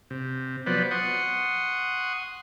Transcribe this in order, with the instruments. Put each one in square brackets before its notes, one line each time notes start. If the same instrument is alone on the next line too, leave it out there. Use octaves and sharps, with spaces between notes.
[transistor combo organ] C3
F3 F#3 B3 B4 C5 D5
F#5 C6 C#6 D#6